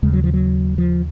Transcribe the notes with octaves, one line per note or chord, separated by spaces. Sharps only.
D#2 C#3 G#3
F#3
F3
F#3
F3